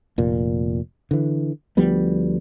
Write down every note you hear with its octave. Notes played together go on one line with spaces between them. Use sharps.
F1 A#2
D3 E3
D2 F3 G3 B3